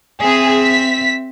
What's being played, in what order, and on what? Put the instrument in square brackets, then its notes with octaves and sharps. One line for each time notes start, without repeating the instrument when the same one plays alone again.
[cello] C4 E5 [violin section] G#4
[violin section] B6